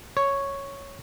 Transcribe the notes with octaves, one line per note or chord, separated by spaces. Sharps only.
C#5